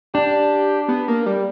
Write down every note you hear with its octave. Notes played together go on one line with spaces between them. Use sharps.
D4 G4
B3
A#3
G3